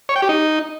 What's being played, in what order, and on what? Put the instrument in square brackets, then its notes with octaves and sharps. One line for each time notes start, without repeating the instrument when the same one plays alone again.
[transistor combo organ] C#5
G5
G4
D#4